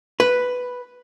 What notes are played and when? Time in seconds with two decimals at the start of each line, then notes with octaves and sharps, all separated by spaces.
0.20 B4